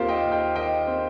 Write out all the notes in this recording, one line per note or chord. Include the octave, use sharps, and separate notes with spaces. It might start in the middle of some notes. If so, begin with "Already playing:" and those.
Already playing: D#2 C4 F4 G4 A#4 C5
D#5 G5
D#2
D#5 G5
D#3 D#5 G5
C4